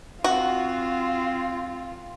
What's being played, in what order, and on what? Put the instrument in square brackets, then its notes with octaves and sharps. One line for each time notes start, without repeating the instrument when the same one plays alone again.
[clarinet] C4 [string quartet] F4 [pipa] F#4